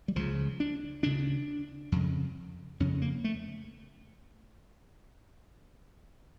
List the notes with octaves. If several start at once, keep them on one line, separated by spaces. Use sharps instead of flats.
G3
C#2 C#3 F3
D4
D2 C#3 D4
F2 C#3
F2 C#3 C#4
A#3
A3